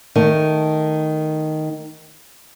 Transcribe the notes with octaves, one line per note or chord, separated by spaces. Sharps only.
D#3 A3